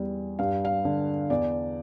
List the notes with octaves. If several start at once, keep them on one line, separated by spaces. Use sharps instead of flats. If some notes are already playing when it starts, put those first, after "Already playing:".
Already playing: E2 G3
G2 F5
F5
D3
E2 D5